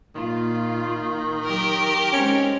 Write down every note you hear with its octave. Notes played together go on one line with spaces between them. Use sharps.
A#2 D#3 F4
F#3 G4 A#4
G#3 C4 C#4 D#4